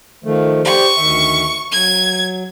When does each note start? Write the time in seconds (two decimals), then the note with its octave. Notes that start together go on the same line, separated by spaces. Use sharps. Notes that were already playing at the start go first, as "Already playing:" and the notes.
0.24 D#3 F3 A3
0.65 G4 C5 D5 C#6
0.97 D2 D#3 E5
1.72 F#3 G#6